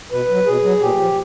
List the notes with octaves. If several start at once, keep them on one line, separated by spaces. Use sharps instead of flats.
B2 B4
F#3
B2 G#4
F#3
A#2 G4
F3